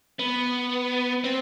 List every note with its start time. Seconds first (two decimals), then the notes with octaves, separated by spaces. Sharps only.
0.19 B3
1.24 C4